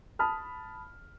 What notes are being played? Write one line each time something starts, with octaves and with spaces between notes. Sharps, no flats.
A5 B5 D#6 F6